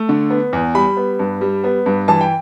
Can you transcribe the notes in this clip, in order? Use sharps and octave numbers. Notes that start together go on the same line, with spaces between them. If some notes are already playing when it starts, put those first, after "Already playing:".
Already playing: A3
D3
B3
E2
G3 B5
B3
G2
G3
B3
G2
E3 A5
G5